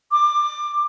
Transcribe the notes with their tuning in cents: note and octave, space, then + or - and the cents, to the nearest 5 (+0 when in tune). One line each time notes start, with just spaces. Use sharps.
D6 +20